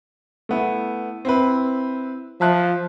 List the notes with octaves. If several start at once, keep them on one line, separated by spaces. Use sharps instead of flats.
A3 B3 E4
C4 E4 B4
F3 E5 A5 F#6